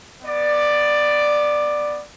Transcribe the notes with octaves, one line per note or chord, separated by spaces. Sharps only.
B3 D5